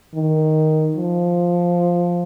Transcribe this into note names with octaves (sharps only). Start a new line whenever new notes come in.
D#3
F3